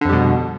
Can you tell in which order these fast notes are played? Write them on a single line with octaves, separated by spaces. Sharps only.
D3 F2 G3 B2